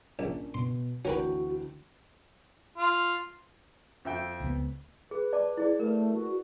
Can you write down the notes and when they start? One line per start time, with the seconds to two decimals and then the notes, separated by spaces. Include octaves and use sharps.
0.19 A#1 C#4 D4 A#4
0.54 B2 C6
1.05 D2 E3 C#4 F#4 A#4 B4 G5
2.78 F4
4.05 F2 E5 G5
4.40 C#2 G#3 B3
5.11 G#4 B4
5.33 D5 A5 D6
5.57 E4 G#4 D5
5.80 A3 A#4 B4
6.14 F#4